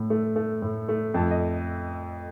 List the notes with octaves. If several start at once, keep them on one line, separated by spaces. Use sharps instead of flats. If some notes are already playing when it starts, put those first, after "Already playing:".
Already playing: A2 A3
A3
A3
A2
A3
F2 A5
D#5